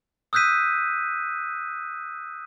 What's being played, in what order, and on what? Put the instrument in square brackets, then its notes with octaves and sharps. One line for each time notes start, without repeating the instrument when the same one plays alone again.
[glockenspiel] D#6 E6 F#6 G6 B6 D#7